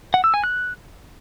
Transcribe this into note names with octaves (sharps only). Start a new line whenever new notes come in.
F#5
E6
G#5
F#6